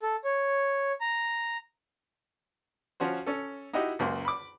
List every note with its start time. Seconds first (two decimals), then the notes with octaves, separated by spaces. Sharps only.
0.02 A4
0.24 C#5
1.01 A#5
3.00 F3 C#4 F#4 C5
3.27 C#4 A4
3.73 D#4 E4 F#4 G4 D#5
3.99 C#2 F#2 A#3 C5
4.25 B5 D6